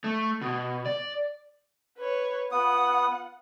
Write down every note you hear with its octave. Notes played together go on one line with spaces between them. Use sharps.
A3
B2
D5
B4 C#5
B3 F4 F#5 D#6